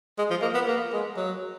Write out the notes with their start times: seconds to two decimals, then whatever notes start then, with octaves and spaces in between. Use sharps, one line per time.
0.19 G#3
0.31 F3
0.42 A#3
0.55 B3
0.68 A#3
0.93 G#3
1.17 F#3